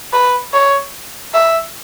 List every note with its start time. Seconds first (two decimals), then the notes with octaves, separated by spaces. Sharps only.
0.13 B4
0.54 C#5
1.34 E5